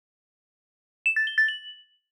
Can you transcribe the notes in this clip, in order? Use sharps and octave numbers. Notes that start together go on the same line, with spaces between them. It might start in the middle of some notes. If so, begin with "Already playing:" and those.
E7
A6
G7
A6
F#7